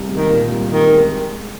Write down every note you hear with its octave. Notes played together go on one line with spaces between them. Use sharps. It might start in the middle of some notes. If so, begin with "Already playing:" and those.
Already playing: C2
G#3
D#3
A#2
C2
C2 D#3
G#3